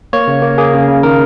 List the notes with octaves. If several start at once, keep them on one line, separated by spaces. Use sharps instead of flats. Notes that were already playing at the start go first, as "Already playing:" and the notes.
A#3 C#5
C#3
A#3
A#3 G#4
C#3
C#3
D#3 A#4